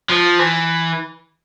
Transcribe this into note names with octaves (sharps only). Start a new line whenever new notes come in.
F3
E3